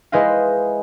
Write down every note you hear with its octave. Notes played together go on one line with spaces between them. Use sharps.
G#3 E4 B4 C5 D#5 F5